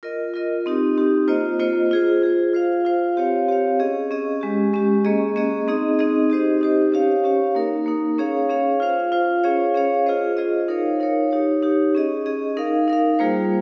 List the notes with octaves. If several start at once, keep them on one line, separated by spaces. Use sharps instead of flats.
F4 A#4 D#5
F4 A#4 D#5
C4 D#4 G4
C4 D#4 G4
A#3 F4 C5 D#5
A#3 F4 C5 D#5
F4 G#4 C5
F4 G#4 C5
F4 C5 F5
F4 C5 F5
C4 G4 C#5 F5
C4 G4 C#5 F5
C#4 G#4 D#5
C#4 G#4 D#5
G#3 C#4 G4
G#3 C#4 G4
A#3 C#4 G#4 D#5
A#3 C#4 G#4 D#5
C4 D#4 G#4 D#5
C4 D#4 G#4 D#5
D#4 G4 C5 D#5
D#4 G4 C5 D#5
C#4 G4 C#5 F5
C#4 G4 C#5 F5
A#3 D#4 A#4
A#3 D#4 A#4
C#4 G#4 C#5 F5
C#4 G#4 C#5 F5
F4 C5 F5
F4 C5 F5
C#4 G#4 C#5 F5
C#4 G#4 C#5 F5
F4 G#4 C5 D#5
F4 G#4 C5 D#5
D#4 A#4 C#5 F5
D#4 A#4 C#5 F5
D#4 G4 C#5
D#4 G4 C#5
C#4 G#4 D#5
C#4 G#4 D#5
D#4 A#4 F5
D#4 A#4 F5
G3 A#3 F4 G#4 C5